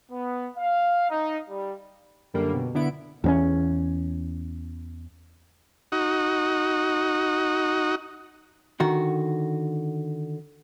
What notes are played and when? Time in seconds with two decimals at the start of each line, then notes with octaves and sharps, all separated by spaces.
0.11 B3
0.57 F5
1.10 D#4
1.49 G3
2.34 F#2 D3 G3 A#3
2.54 B2
2.75 D3 B3 E4 D7
3.24 E2 C4 C#4
5.92 D#4 F#4
8.80 D3 D#3 F#4